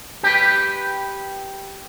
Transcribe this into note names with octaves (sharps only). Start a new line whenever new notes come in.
G4 B4